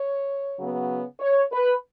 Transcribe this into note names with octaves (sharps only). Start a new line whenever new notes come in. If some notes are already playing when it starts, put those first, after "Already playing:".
Already playing: C#5
C#3 F#3 B3
C#5
B4